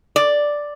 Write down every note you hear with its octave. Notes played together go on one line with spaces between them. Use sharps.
D5